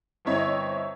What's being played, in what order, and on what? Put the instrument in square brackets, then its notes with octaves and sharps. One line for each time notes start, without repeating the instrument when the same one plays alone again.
[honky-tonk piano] G1 C4 E4 C#5 D#5